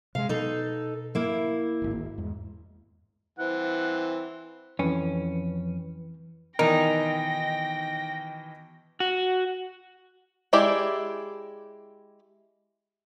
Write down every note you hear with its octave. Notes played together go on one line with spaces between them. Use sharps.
C3 G#3 F5
B2 D#4 A4
A#3 E4
D1 G#1
E2 G#2
E3 C4 F#5
F2 E3 C#4 B4
B2 D#3 E3 D#4 A#4 G5 A#6
F#4
G#3 E4 G4 D5 B5